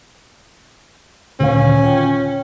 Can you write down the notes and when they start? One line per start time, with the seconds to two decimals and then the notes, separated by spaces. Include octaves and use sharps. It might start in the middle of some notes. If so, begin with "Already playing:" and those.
1.40 D#1 D2 C#4 F5
1.84 F4 G5